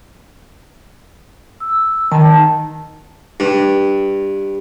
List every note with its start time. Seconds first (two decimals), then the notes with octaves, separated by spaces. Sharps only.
1.60 E6
2.12 D#3 A5
3.40 G2